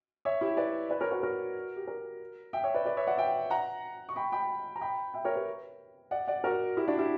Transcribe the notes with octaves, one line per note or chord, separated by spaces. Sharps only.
C#5 E5
E4 G4
B4 D5
B4 D5
A#4 C#5
F#4 A#4
F#4 A#4
G4
F#4 A#4
E5 G5
C#5 E5
B4 D5
B4 D5
C#5 E5
D5 F#5
E5 G5
F#5 A#5
C#6
G5 B5
G5 B5
A#5
G5 B5
E5 G5
A#4 C#5
G4 B4
D5 F#5
D5 F#5
F#4 A#4
E4 G4
D4 F#4
E4 G4